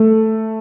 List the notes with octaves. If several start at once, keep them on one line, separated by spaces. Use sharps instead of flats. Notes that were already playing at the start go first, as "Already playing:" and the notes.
Already playing: A3 A4